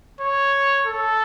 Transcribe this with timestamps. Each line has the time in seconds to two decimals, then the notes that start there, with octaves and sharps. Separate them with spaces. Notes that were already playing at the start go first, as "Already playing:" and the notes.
0.21 C#5
0.86 A4